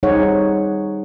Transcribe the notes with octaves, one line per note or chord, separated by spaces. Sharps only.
G3 D#4 G#4 C5 C#5 F#5